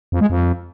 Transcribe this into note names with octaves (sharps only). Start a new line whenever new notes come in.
F2
G#3
F2